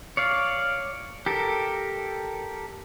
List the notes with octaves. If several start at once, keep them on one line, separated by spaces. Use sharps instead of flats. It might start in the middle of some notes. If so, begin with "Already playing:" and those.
C#5 D5 F5
G4 A4 A#4